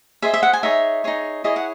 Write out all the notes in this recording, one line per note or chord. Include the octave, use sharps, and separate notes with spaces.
G#4 C5 D#5 E5
E5
F#5
G#5
D#4 G#4 C#5 E5
D#4 G#4 C#5
E4 G#4 C#5 D#5
F#5